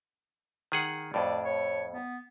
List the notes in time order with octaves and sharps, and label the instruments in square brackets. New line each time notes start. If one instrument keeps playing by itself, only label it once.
[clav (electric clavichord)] D#3 G#4 F#5
[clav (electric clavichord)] F2 A2 [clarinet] D5
[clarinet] C#5
B3